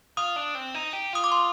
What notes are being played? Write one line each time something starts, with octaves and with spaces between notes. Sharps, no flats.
F4 D#6
D4
C4
D#4
G4
F4 D#6
D6
C6